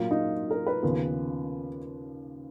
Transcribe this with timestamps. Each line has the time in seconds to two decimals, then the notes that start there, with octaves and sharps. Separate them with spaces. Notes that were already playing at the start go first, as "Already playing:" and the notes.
Already playing: A#2 F#3 A#3 F4
0.11 D#4
0.51 A#4
0.67 B4
0.83 D#2 C#3 F3 B3